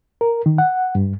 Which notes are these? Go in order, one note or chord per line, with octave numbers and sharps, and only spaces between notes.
A#4
D#3
F#5
G2